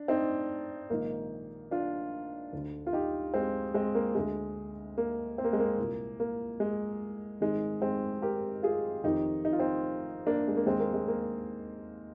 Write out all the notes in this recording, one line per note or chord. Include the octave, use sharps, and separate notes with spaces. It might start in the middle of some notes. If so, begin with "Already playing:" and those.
Already playing: D4
C4 D#4
A#1 G#2 D#3 A#3
D4 F4
D2 D3
F4
D#4 G4
G#3 C4
G#3 C4
A#3
D2 D3 G#3
A#3
C4
A#3
G#3
A#3
C2 A#2
A#3
G#3
G#1 G#2 D#3 G#3
G#3 C4
G4 A#4
F4 G#4
F1 F2 D#3 D#4 G4
D#4
F4
C4 D#4
A#3 D4
G#3
A#3
D#2 D#3 G#3 C4
A#3
G#3
A#3